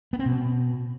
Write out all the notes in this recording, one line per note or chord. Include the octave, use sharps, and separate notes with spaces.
B3
C4
B2